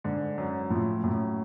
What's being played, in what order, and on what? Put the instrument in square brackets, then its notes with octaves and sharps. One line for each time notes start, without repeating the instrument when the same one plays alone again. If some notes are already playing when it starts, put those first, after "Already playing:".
[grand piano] G#2 [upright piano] D3
[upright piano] F#2
[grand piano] A2 [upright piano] F3
[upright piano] F#2 [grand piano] A2